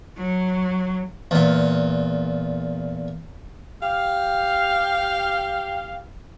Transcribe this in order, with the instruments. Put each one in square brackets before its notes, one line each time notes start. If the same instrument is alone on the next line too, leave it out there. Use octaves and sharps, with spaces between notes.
[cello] F#3
[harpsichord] E2 A#2
[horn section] G4 F5